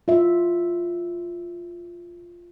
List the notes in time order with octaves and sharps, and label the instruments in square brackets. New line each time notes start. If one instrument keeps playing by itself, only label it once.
[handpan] F4 E5